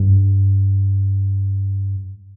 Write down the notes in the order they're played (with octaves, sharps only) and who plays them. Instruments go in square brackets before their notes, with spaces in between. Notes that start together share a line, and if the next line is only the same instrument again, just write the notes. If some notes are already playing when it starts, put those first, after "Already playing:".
Already playing: [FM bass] G2